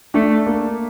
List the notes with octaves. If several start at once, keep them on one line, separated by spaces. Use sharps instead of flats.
A3 D4
A#3